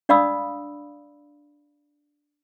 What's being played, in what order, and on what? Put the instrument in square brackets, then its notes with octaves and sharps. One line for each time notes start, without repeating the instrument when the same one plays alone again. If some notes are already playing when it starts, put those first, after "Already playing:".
[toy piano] D4 D5 F5 B5 D#6 E6